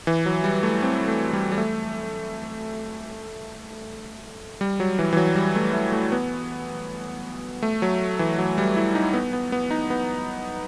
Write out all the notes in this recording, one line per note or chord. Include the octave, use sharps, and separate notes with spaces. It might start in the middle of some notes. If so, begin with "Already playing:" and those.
E3
F#3
G3
A3
C4
A3
G3
G3
A3
G3
F#3
E3
E3
F#3
G3
A3
A3
A3
B3
A3
F#3
E3
F#3
G3
E4
D#4
B3
B3
B3
D#4
B3